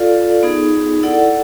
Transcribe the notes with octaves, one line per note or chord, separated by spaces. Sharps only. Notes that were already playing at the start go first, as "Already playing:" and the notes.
Already playing: F4 A4 D5 F5
B3 D#4 G#4
E4 A4 D5 F#5